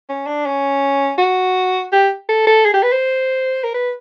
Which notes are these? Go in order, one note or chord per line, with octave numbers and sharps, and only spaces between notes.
C#4
D4
C#4
F#4
G4
A4
A4
G#4
G4
B4
C5
A#4
B4